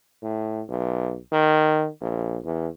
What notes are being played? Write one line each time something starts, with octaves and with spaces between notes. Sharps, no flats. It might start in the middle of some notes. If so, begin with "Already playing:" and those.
A2
B1
D#3
A#1
E2